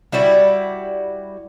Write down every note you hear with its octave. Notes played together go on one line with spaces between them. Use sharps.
G3 E4 F#4 D5